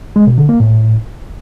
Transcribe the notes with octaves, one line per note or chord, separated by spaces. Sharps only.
G#3
B2
D3
A#3
A2